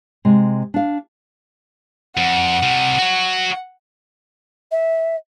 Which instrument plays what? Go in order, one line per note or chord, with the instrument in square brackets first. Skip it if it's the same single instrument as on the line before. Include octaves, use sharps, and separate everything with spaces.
[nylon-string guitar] C3 G#3
D4 F5
[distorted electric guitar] F2 [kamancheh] F#5
[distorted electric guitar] C3 G3
F#4 C#5
[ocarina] E5